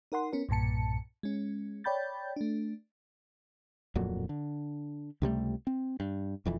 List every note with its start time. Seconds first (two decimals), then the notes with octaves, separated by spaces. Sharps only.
0.12 D#4 A#4 F#5 C6
0.33 B3 C#4 A#4
0.49 B1 G2 A#2 A5 C#7
1.23 G#3 C#4
1.84 C#5 D5 G5 B5 G6 A6
2.36 A3 D4
3.95 D1 F2 A#2 F#3
4.29 D3
5.22 C#2 C3 G3 A3
5.67 C4
6.00 G2
6.45 E1 F2 E3